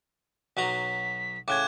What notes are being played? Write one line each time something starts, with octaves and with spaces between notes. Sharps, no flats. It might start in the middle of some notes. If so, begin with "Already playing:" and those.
B1 F#3 A#5 B6
A2 C#3 D6 F#6 G#6